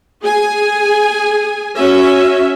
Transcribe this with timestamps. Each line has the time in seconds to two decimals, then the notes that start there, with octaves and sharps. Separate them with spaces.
0.22 G#4 G#5
1.76 C#4 F#4 E5